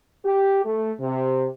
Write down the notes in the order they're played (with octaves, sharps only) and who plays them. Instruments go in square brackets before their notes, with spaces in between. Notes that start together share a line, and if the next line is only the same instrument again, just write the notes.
[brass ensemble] G4
A3
C3